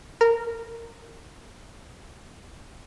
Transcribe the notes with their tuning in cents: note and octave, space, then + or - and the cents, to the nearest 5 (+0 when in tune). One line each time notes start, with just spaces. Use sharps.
A#4 -15